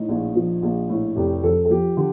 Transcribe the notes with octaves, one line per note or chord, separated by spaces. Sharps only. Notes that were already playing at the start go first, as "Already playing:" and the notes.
Already playing: A2 D#4
A#1
F3
A#1
A2
F1 G4
F2 A4
A4
F3 G4
D3 G4